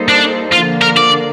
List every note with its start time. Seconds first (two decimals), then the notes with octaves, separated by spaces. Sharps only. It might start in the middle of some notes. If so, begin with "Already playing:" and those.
Already playing: G3 A#3 D#4 A4 C5
0.08 D4
0.52 D3 F3 A#3 F4
0.82 A#4
0.97 D5